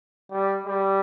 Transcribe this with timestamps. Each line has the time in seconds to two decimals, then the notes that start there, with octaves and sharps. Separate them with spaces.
0.31 G3
0.66 G3